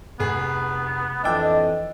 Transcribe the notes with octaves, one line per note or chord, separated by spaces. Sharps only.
F1 B3 G#4
F2 E3 D4 D#5 G5 D6 E6